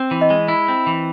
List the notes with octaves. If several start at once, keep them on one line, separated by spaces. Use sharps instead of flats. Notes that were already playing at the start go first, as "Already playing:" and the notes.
Already playing: C4
E3
D#5
G#3
E4
C4
E3